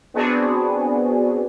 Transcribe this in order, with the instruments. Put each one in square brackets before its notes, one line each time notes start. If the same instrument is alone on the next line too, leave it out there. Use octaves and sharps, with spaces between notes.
[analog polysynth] B3 C4 D4 F#4 G#4